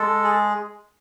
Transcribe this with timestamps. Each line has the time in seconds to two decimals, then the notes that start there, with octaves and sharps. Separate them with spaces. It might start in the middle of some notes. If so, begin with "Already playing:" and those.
Already playing: G#3 A4
0.24 G#4